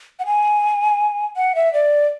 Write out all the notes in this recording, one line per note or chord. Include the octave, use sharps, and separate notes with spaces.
F#5
G#5
F#5
E5
D5